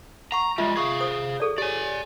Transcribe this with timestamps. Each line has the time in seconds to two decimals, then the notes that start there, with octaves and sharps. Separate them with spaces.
0.32 F#5 A#5 C#6
0.58 G3 G#3 F4 E5
0.77 G#4 F5 C#6
1.00 C5 D#6
1.40 G#4 A4 D5
1.58 G4 C#5 D5 G#5